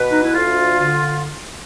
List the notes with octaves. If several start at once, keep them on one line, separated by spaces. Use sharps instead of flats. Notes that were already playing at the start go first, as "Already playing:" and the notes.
Already playing: B2 B4
D#4
E4
D2 F4
D3